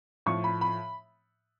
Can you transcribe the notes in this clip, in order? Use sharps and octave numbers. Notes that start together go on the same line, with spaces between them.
A2 F3 C#6
B5
B5